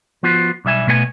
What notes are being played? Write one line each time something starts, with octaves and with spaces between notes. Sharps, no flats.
F3 B3 F4 F#4
B1 G3 E5 G#5
B2 A3 B3 D5 G#5